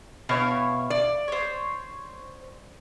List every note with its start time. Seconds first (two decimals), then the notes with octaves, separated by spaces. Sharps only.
0.29 B2 E4 C#5 F5
0.90 D5
1.28 C5 C#5